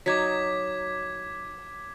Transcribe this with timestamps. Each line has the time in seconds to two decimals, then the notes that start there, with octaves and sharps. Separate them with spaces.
0.06 F#3 D#4 D6 G#6 B6